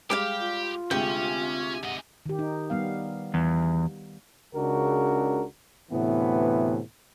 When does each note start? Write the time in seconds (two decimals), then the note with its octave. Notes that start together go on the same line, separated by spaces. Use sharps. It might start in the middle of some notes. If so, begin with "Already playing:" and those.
0.10 G3 G#3 G4 F5 G5 D6
0.41 F4
0.91 D2 C3 G#3 C#4 G5
1.83 G#2 D#5 F#5
2.26 D#3 G4
2.39 D#4
2.70 G3 B3 F5
3.34 E2
4.55 C#2 C#3 G#3 D4 F#4 A#4
5.90 D2 A2 C3 E3 B3